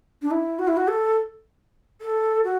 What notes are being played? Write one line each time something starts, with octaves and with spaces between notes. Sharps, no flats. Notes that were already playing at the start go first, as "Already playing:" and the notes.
D4
E4
F#4
E4
F#4
A4
A4
F#4